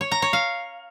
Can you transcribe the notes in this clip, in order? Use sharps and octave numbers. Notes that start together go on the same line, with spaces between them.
C#5
A#5
C#5
F5